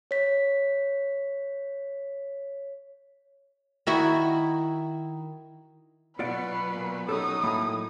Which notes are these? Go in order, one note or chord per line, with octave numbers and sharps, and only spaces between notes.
C#5 B6
D#3 E4 F#4
B2 F#3 B3 F4 B4 D5 F#5
A#2
F#3 C#4 D#4 G4 A4 D#6
A2 F#3 A#3 B5